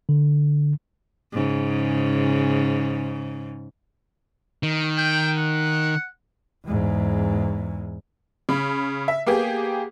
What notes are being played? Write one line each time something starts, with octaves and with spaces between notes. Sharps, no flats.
D3
G#2 C#3
D#3
G5
F#5
E2 G#2
C#3 B5
E5
A#3 B3 G4 G#4